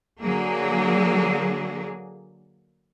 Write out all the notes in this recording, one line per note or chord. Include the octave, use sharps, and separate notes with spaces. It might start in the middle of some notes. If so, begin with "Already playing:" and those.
D3 F#3 A#3 G#4